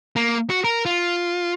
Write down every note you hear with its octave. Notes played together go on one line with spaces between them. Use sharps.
A#3
F#4
A#4
F4